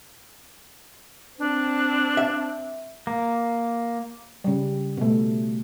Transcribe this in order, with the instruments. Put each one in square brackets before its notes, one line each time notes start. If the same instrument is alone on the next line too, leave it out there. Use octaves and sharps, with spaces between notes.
[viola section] C4 [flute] D4
[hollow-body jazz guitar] E5
[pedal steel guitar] A#3
[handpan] C#3 G3
B2 A3